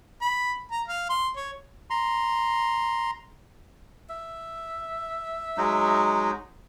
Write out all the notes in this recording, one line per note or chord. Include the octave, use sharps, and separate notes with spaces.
B5
A#5
F5
C6
C#5
A#5 C6
E5
F#3 G#3 D#4